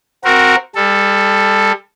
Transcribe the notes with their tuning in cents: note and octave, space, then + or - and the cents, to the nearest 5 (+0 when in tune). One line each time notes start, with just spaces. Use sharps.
C4 -5 F#4 -10 A#4 +0
G3 +30 A4 +0